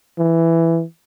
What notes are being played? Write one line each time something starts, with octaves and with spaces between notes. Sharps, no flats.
E3